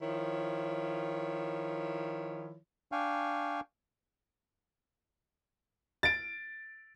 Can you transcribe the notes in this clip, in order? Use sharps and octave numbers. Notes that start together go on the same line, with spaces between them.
D#3 F3 E4 C#5
D4 F5 G5 G#5 C#6
A6 D7